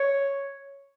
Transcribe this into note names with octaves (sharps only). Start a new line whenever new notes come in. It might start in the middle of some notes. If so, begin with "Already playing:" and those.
Already playing: C#5